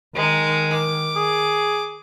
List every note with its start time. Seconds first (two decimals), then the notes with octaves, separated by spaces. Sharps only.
0.15 D#3 G#3 D#4
0.73 D6
1.16 G#4